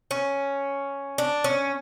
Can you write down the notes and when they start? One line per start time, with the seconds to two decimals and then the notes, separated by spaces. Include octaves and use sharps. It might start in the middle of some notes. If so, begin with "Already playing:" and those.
0.11 C#4
1.18 D4
1.44 C#4